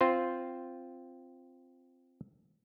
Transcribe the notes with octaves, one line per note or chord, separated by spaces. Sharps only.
C4 F4 C5